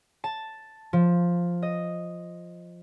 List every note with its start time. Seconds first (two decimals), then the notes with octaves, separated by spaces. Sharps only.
0.24 A5
0.93 F3
1.62 D#5